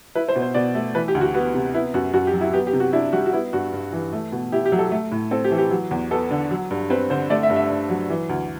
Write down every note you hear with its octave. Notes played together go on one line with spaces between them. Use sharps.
E4 B4
C5
B2
C5
B2 D5
A3
E3 B4
G4
D2
F#4
B3 F#4
C3
B3 E4
F#2 F#4
F#2 F#4
G4
F#3
E4
B3 G4
G4
C3
F#4
D4 E4
G3 F#4
F#4
B3 E4
G2 F#4
G2
E3
A3
B2
E4 G4
G4
F#3
A4
A3
A2
C4 A4
G4
E3
G4
F#3
E2
B3 A4
D3
F#3
G2
C4 B4
D3 C5
A3 D5
E5
G2
E5
G2
F#3
E3
D2